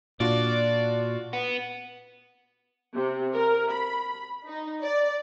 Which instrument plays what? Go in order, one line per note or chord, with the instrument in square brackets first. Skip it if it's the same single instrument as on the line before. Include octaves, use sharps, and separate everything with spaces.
[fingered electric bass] A#2 [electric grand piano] D4 F4 F#4 [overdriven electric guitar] D5
[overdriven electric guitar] B3
[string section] C3
A#4
B5
D#4
D5